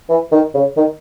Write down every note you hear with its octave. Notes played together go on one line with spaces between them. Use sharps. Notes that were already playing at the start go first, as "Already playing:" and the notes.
E3
D#3
C#3
D#3